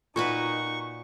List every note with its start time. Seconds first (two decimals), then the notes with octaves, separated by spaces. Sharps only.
0.16 A#2 D#4 F4 F#4 B4 C#6